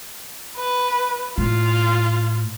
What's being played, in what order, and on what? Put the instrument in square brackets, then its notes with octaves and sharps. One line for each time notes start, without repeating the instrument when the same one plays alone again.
[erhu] B4
[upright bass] A2 [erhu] F4